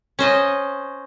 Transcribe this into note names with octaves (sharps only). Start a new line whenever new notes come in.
C#4 C5 D#5